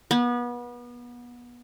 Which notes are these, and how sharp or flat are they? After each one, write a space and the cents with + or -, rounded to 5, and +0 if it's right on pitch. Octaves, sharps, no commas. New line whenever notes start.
B3 -30